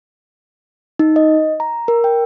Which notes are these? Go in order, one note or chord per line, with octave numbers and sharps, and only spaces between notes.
D#4
D#5
A#5
A#4
G5